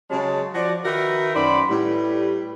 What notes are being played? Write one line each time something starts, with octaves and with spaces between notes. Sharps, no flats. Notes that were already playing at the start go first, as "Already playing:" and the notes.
C#3 F#3 G#3 C#4 G#4 A5
F3 F#4 D5
D#3 D#4 F#4 A#4 B4 E5
F#2 D#3 C5 D5 F#5 B5
A2 G3 B4